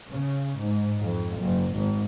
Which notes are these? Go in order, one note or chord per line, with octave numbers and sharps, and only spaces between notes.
C#3
G#2
F2
F#1
G#1